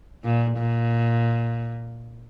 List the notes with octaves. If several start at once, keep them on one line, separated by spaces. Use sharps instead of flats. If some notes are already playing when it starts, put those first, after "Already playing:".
A#2
A#2